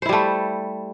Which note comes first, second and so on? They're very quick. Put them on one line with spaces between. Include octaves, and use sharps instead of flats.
C5 E4 G3 A3